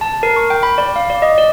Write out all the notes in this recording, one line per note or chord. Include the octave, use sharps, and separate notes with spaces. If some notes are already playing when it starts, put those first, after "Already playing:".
A5
A#4
C#6
G5
B5
D5
F5
D5
D#5
D5